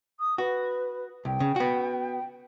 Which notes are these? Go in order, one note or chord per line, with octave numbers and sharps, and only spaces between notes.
D#6
F#4 B4
C2 G5
C#3
B3 F#4